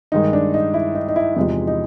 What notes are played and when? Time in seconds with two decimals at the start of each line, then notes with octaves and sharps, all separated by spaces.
0.12 G2 D#3 G#3 D#4
0.33 D4
0.54 D#4
0.74 E4
0.95 D#4
1.08 D#4
1.16 E4
1.36 E2 C3 F3 G#3 D#4
1.67 D#4